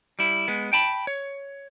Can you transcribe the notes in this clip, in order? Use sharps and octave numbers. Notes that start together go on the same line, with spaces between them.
G3 E4
G#3 B3
G5 A5 B5
C#5